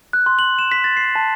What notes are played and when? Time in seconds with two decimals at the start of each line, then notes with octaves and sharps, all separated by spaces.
0.13 F#6
0.26 C6
0.39 F#7
0.59 E7
0.72 B6
0.84 A6
0.97 C7
1.15 A5